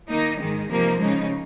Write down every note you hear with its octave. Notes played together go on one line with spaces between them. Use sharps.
D#3 A#3 D#4
G#2 D#3 G#3
C3 F3 A#3 D#4
C#3 G#3 D#4